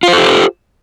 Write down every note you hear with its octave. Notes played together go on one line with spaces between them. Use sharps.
F4 G4 A4 C5